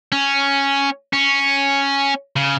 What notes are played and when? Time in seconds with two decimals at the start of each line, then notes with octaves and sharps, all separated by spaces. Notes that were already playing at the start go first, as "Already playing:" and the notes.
0.12 C#4
1.13 C#4
2.36 C#3